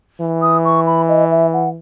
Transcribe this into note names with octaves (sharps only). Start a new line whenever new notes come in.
E3
D#6
C#6
B5
D#5
E5
F#5